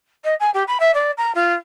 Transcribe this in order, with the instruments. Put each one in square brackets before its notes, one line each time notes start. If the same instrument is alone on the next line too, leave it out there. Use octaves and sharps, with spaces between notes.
[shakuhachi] D#5
G#5
G4
B5
E5
D5
A#5
F4